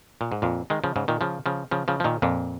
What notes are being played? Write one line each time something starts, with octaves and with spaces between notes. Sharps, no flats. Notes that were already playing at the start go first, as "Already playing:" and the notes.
A#2
G#2
F2 A#2
D#3 G#3
C#3 F3
G#2 C#3
A#2 D#3
C#3 F3
C#3 F3
C#3 F3
C#3 F3
F3
A#2 D#3
F2 A#2